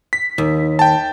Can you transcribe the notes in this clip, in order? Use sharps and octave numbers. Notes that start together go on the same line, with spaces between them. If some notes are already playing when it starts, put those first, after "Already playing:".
B6
D#2
G5 A5